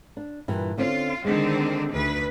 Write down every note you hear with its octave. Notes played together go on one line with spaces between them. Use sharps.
D4
G2 A#2 E3
D3 C4 C#4 F4
D3 D#3 G#3 C4
D2 B4